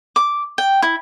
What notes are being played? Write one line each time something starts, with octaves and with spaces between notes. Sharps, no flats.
D6
G5
E4